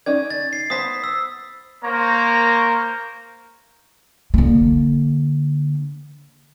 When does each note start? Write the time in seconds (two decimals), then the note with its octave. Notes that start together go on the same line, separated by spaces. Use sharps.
0.06 C#4 D#4 D5 G#6
0.30 A6
0.53 C7
0.70 B3 C5 A5 D#6 B6
1.04 E6
1.83 A#3 A#4 C5 C#5 A#5
4.34 D3 A#3